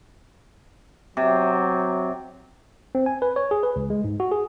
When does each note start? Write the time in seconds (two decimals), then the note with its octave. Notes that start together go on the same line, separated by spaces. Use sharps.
1.17 C3 F#3
2.95 C4
3.06 G#5
3.22 B4
3.36 C#5
3.51 G#4
3.63 B4
3.76 C#2
3.90 G#3
4.04 G#2
4.20 F#4
4.32 G#4